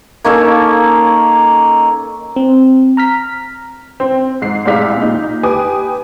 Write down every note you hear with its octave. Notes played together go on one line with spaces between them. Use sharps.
A#3 C#4 D#4 A4
C4
A#5 F6 B6
C4
G#2 C7
C2 A2 G#3 D5 F5 B6
A#2 D#4
G4 B4 G#5 D6 D#6